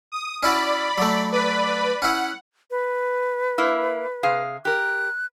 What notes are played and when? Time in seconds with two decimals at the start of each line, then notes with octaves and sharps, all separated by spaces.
0.12 D#6
0.43 C#4 E4 F#4 D5 B5
0.98 F#3 A3
1.32 B4 D5 B5
2.02 C#4 E4 F#5
2.71 B4
3.58 A#3 E4
4.23 C3 G#4 F5
4.65 G4 A#4 F#6